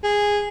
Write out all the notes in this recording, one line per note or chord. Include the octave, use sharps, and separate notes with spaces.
G#4